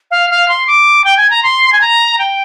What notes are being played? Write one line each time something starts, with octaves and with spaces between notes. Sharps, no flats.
F5
F5
C6
D6
G5
G#5
A#5
C6
G#5
A#5
G5